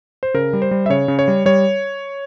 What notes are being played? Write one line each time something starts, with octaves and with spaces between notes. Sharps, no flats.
C5
C#3 A#4
G3
C5
G3
E5
C#3 C#5
C#3
C#5
G3
G3 C#5